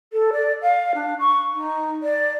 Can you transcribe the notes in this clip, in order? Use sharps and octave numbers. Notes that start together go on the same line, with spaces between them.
A4
D5
F5
D4
C#6
D#4
D5